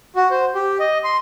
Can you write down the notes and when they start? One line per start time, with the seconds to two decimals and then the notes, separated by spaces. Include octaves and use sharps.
0.16 F#4
0.31 C5
0.55 G4
0.80 D#5
1.04 C6